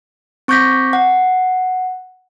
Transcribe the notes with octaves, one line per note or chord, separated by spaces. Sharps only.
C4 C#6 D6 G6 A#6 B6
F#5